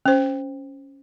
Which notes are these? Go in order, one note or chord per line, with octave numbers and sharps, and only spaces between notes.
C#4 C5